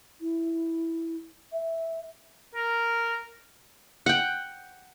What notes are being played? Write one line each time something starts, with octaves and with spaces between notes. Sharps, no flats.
E4
E5
A#4
F#5 G5